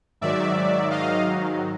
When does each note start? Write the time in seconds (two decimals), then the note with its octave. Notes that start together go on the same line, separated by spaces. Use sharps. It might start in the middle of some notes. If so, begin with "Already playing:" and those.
0.21 G#2 D#3 F#3 D5 E5
0.91 D#5 F5